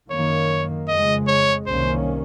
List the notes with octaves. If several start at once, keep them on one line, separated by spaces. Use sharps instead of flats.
F#2 D#3 A#3 C#5
F2 C#3 G#3 D#5
C#5
C2 C3 D#3 A#3 C#4 C5